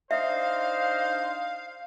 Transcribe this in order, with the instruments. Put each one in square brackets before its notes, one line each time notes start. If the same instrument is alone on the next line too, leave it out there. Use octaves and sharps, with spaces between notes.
[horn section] D4 D#4 C5 [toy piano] E5 [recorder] F5